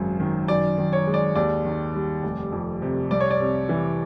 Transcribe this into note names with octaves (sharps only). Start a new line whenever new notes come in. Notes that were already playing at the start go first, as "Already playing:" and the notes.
Already playing: G#1 F#2 G#3
D#3
F#2 D5
D#3
C#5
G#3
D5
D#2 D5
D#3
G3
F1
F2
C3
C2 D5
C#5
D5
C3
E3